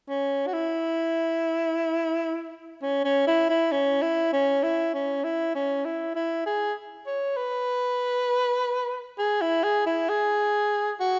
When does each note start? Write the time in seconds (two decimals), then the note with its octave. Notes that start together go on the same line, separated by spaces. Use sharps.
0.09 C#4
0.47 F#4
0.53 E4
2.82 C#4
3.05 C#4
3.27 E4
3.50 E4
3.72 C#4
4.02 E4
4.33 C#4
4.63 E4
4.94 C#4
5.24 E4
5.55 C#4
5.85 E4
6.15 E4
6.46 G#4
7.06 C#5
7.37 B4
9.19 G#4
9.41 E4
9.63 G#4
9.86 E4
10.09 G#4
11.00 F#4